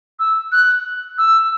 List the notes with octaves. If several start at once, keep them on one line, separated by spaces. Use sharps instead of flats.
E6
F#6
E6